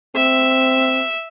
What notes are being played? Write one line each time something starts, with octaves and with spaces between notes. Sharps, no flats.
C4 E5